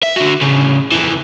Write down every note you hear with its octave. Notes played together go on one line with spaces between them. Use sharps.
E5
D3 F#4
A2 C#3
F2 E3